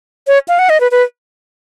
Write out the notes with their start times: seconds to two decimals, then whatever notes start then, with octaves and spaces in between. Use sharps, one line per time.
0.27 C#5
0.48 F5
0.59 F#5
0.70 D#5
0.81 B4
0.91 B4